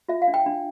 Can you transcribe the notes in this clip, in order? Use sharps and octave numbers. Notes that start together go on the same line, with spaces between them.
F4 E5
F5
D4
G5
D4